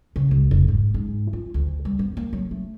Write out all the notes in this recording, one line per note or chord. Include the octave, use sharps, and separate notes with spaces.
C#3
C#2
F1
G#2
G#2
F4
D2
G3
B3
A#3
F#3
A3